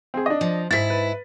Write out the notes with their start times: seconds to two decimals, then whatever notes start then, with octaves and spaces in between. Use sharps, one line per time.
0.14 C4 G#4
0.26 D4 D#5
0.41 F3
0.71 G#2 E4 A6 B6
0.90 B4